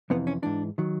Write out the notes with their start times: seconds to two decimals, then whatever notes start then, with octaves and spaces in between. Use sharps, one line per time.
0.10 F2 C3 E3 B3
0.27 C#4
0.42 G#2 E3 D4
0.78 D#3 F#3